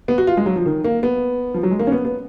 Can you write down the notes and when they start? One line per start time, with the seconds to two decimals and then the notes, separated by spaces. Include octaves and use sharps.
0.08 B3
0.18 F#4
0.27 F4
0.37 G#3
0.46 F#3
0.56 F3
0.66 D#3
0.84 A#3
1.03 B3
1.54 F3
1.63 F#3
1.71 G#3
1.79 A#3
1.87 C#4
1.92 B3
2.05 B3